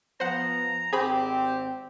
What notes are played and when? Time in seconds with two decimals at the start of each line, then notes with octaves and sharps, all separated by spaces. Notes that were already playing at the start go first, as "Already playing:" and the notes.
0.20 F3 B3 C5 F#5 A#5
0.93 G#1 C4 G4 G#4 C5 B5